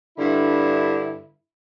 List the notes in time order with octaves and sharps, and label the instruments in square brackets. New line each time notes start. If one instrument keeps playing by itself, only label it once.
[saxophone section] G2 D3 E4